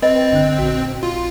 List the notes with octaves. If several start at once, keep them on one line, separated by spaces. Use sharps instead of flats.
C4 B4 D#5
G1 D3 F#6
A#1 F#4
F4